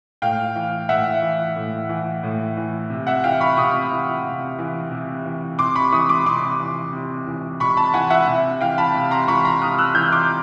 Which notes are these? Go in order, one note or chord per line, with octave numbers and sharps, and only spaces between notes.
A2 F5 G5
E3
A2 E5 F#5
E3
A2
E3
A2
E3
C3
E5 F#5
E3 F5 G5
B5 C#6
C3 C#6 D#6
E3
C3
E3
C3
E3
C3 C6 D6
B5 C#6
E3 C#6 D#6
C6 D6
C3 C6 D6
E3
C3
E3
C3 B5 C#6
A5 B5
E3 F#5 G#5
E5 F#5
C3
E3 F5 G5
A5 B5
C3
A#5 C6
E3 B5 C#6
A#5 C6
C3 D#6 F6
E6 F#6
E3 F6 G6
C6 D6